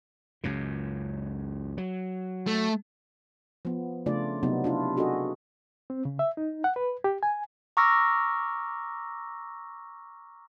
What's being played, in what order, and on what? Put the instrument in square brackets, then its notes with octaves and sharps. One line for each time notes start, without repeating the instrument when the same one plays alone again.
[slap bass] C#2 F#2 C#3
F#3
[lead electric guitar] A3
[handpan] F3 B3
C#3 A3 D4 F4 D5
C3 F#3 B3 C4 D#4
D4 E4 F4
D4 F#4 G#4 A4 D#5
[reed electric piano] C4
C#3
E5
D#4
F#5
B4
G4
G#5
[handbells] A#5 C#6 D6 E6 F6 A#6